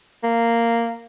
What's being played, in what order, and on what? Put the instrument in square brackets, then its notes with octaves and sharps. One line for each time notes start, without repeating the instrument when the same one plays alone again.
[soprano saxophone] A#3